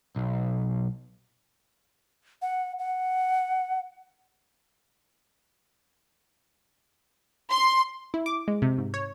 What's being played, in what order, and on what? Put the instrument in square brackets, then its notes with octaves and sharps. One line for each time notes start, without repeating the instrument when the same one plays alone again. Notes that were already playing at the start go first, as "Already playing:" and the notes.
[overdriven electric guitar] B1
[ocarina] F#5
F#5
[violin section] C6
[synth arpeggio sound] E4
D6
G#3
C3
G#2
C#5